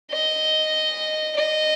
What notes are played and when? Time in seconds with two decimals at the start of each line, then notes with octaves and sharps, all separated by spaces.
0.12 D#5
1.36 D#5